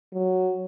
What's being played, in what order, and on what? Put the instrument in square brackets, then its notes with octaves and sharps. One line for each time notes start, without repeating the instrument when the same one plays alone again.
[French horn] F#3